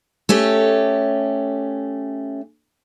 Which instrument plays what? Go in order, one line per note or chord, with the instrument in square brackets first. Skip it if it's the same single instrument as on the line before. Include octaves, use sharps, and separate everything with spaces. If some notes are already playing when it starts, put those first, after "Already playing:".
[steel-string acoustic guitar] A3 C#4 G4